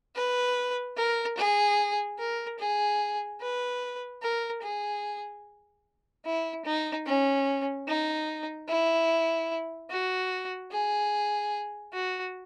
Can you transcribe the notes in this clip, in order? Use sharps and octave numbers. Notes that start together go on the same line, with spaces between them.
B4
A#4
G#4
A#4
G#4
B4
A#4
G#4
E4
D#4
C#4
D#4
E4
F#4
G#4
F#4